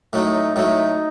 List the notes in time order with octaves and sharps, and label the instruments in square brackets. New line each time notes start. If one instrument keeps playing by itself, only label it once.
[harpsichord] A2 F#3 A3 [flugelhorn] D#4
[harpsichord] A2 F#3 A3 [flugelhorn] D#4